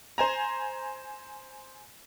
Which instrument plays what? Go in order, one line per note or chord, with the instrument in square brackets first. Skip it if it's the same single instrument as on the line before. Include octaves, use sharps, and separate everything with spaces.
[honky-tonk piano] C5 G#5 A#5